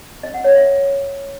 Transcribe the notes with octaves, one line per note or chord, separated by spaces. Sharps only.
D#5
F#5
C#5
E5